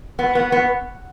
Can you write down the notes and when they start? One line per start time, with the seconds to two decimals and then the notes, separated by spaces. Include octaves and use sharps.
0.19 B3
0.35 B3
0.52 B3